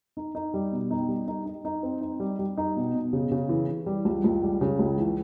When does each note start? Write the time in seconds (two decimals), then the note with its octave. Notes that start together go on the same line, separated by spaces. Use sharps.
0.17 D#4
0.35 D#4
0.54 G3
0.72 B2
0.91 D#4
1.09 G3
1.28 D#4
1.46 D#4
1.65 D#4
1.83 C4
2.01 D#4
2.20 G3
2.39 G3
2.57 D#4
2.76 B2
2.94 B2
3.13 C#3
3.31 C#3
3.49 E3
3.68 E3
3.86 G3
4.05 C#2
4.24 C#2
4.42 G3
4.61 C#3
4.79 C#2
4.98 E3